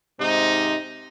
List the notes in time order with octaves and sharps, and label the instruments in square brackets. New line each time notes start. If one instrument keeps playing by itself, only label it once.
[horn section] G#2 C3 D#4